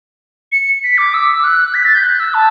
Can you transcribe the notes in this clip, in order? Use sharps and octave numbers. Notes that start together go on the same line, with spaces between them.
C#7
B6
D6
E6
F#6
B6
A6
G6
F#6
E6
A5